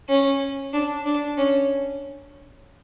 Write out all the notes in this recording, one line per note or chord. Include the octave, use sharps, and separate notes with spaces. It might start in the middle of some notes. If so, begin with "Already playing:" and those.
C#4
D4
D4
C#4